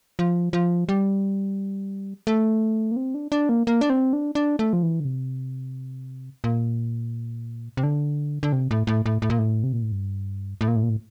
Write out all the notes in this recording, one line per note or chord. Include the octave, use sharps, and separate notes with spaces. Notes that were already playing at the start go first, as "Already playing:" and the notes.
F3
F3
G3
A3
A#3
C4
D4
D4
A#3
A#3
D4
C4
D4
D4
A3
F3
E3
D3
C3
A#2
C3
D3
D3
C3
A2
A2
A2
A2
A#2
A2
C3
A#2
A2
G2
A2
A#2
A2
A#2
A2